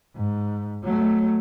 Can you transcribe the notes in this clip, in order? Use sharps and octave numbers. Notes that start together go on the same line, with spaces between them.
G#2
F#3 A3